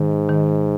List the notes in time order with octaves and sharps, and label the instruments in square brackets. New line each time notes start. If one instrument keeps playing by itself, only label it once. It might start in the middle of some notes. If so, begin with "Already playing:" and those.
Already playing: [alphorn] G#2 [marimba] D#3
[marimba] D#3